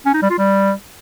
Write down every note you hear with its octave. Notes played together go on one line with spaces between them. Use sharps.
C#4
D#4
G3
F4
G3